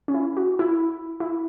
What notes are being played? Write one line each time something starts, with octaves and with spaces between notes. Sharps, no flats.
C#4
E4
F#4
E4
E4